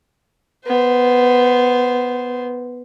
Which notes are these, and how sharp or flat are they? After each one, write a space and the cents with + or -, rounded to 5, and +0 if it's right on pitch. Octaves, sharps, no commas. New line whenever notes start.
B3 +0 C5 -10